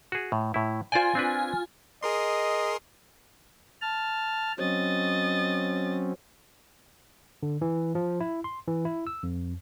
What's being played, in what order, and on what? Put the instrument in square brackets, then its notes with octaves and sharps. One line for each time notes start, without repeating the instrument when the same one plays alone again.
[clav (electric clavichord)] F#4 G#4
A2
A2 E4
[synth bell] F4 G#5 [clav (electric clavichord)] C5 D5 G5
[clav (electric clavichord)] C4 D4 B4
[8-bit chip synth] G#4 A#4 C6 [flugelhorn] D#5
[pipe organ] A5 F6
[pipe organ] F#3 C4 C#4 [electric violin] D#5 A6
[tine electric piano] D3
E3
F3
E4
C6
E3
E4
E6
F2